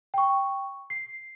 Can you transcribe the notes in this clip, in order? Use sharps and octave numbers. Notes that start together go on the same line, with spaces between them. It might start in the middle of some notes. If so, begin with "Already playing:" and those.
G5 C#6
C7